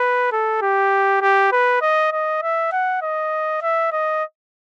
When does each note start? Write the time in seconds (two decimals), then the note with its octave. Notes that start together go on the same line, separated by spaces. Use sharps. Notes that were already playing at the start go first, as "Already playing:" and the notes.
Already playing: B4
0.32 A4
0.62 G4
1.22 G4
1.52 B4
1.82 D#5
2.12 D#5
2.42 E5
2.72 F#5
3.02 D#5
3.62 E5
3.92 D#5